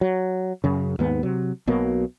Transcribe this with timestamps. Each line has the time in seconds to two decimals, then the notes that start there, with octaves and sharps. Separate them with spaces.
0.01 F#3
0.64 F#2 C#3
0.99 D#2 G#2 B3
1.23 C3 F#3
1.67 B1 B2 F#3 A#3